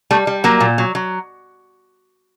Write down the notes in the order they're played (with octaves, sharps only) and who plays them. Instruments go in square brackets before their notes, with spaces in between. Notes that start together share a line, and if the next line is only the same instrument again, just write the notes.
[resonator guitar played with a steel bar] G3 A3
G3
F#3 A#3
A#2
F#3
F#3